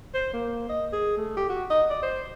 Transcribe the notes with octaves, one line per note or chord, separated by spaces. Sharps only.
C5
A#3
D#5
G#4
A3
G4
F#4
D#5
D5
C5